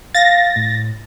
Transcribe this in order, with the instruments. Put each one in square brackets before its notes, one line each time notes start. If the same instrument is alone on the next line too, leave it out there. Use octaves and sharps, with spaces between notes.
[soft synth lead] F5 [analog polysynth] A6 A#6
[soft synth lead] A2